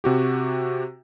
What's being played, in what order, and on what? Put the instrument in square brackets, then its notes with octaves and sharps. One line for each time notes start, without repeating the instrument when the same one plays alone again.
[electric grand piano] C3 F#4 G4